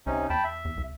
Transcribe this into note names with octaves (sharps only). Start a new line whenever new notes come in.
C2 C3 C#4 D#4
E2 G5 A5 B5
E5
E2
C2